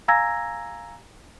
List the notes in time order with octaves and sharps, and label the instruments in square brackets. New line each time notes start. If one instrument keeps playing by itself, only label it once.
[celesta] F5 G#5 A#5 E6 G#6 A#6